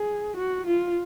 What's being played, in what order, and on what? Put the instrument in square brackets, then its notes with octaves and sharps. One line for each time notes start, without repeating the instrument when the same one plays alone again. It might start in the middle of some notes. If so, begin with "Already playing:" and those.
Already playing: [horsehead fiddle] G#4
F#4
F4